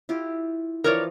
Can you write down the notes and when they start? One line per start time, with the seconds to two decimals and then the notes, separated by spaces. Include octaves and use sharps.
0.09 E4 F4 G4
0.84 E3 F3 A#4 C#5 D5 C#6